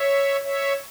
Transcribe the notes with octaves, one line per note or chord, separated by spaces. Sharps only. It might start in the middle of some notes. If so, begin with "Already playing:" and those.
Already playing: C#5 E5
C#5 E5